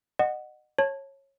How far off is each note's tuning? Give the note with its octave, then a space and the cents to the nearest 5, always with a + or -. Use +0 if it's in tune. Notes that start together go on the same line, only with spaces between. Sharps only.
D#5 -30 F#5 +0
C#5 -20 A5 +0